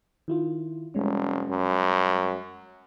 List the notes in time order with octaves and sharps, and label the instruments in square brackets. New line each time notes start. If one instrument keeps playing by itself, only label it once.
[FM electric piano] D#3 E4 F4
[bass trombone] F1 [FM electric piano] G3 G#3 C#4
[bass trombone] F#2